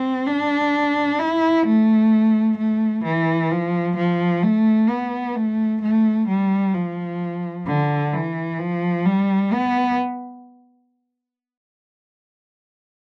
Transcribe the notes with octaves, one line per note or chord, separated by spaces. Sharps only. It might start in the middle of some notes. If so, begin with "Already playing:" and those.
Already playing: C4
D4
E4
A3
A3
E3
F3
F3
A3
B3
A3
A3
G3
F3
D3
E3
F3
G3
B3